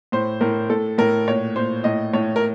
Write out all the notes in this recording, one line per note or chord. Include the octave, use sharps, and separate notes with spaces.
A2 C5
A2 A#4
A2 A4
A2 A#4
A#2 C#5
A#2 C5
A2 D#5
A2 C#5
A#4